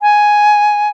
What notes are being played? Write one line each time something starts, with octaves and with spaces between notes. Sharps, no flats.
G#5